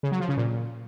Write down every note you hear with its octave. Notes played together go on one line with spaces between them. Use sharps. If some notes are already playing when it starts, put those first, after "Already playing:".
C#3
F#3
F3
C#3
A#2